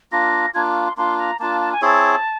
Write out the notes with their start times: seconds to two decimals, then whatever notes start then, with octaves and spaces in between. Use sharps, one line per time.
0.12 A#3 D4 F4 A#6
0.54 A#3 D4 F4 G#6
0.65 D6
0.76 C#6
0.82 B5
0.86 C6
0.97 A#3 D4 F4 C6
1.18 A#5
1.39 A#3 D4 F4 A5
1.61 A5
1.73 G#5
1.81 C4 E4 G#4 C#5 A5